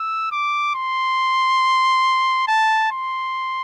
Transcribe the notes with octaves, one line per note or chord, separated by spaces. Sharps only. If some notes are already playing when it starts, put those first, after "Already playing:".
Already playing: E6
D6
C6
A5
C6